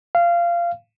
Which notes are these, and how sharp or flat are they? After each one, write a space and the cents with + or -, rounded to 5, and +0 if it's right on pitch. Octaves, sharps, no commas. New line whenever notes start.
F5 -20